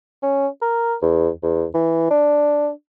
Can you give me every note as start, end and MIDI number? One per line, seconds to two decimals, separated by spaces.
0.23 0.47 61
0.61 0.95 70
1.02 1.29 40
1.43 1.64 40
1.74 2.09 52
2.10 2.69 62